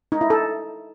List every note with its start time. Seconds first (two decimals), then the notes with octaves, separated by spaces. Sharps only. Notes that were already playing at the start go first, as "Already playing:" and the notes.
0.12 D#4
0.21 E4
0.30 A4